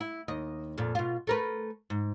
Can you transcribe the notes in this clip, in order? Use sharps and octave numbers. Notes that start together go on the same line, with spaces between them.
E4
D#2 D#5
F2 A#2
B2 F4
A3 A#4 B4
G#2